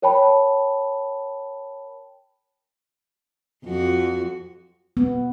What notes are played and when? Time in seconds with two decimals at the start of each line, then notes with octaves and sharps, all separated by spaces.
0.02 A#4 C#5 G5 A5 B5
3.65 F2 F#4
4.97 B3